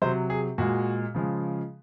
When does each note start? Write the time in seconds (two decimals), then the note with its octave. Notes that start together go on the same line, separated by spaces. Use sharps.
0.02 C3 F#3 C5
0.30 G#4
0.58 A#2 G#3 F#4
1.14 C#3 F3 G#3